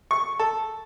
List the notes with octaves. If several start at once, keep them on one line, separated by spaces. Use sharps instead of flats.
C#6
A4